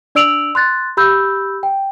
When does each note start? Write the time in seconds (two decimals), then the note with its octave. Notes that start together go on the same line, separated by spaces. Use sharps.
0.15 D4 D5 E6 D7 F7 F#7
0.55 C6 F#6 A6
0.97 G4 B5 E6 G6
1.63 G5